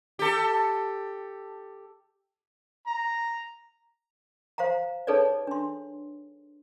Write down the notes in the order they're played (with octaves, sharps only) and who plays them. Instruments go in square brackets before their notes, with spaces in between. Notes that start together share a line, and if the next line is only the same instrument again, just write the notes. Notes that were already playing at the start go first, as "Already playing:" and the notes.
[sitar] G4 A4
[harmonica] A#5
[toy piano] C5 F5 F#5 A#5
D#4 G#4 A4 B4 C#5 D5
D4 C6